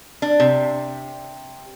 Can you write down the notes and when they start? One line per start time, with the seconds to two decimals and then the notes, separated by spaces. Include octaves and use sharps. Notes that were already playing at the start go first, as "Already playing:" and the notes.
0.22 D4
0.40 C3